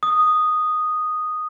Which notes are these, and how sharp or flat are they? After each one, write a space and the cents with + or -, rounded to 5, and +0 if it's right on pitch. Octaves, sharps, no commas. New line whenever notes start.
D#6 -5